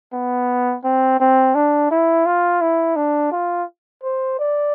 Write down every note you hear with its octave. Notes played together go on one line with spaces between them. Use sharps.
B3
C4
C4
D4
E4
F4
E4
D4
F4
C5
D5